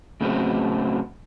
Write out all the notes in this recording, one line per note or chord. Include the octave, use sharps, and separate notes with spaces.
A2 C#3 F#3 B3 C4